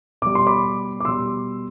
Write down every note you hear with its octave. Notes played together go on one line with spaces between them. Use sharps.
B2 G3 D6
C6
B5 D6
D6
B2 G3 C6 E6